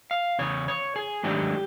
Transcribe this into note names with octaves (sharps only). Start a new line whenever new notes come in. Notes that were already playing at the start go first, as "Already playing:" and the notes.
F5
E2 C#3 C#5
C#5
G#4
G#2 D#3 F#3 A3 D4 G4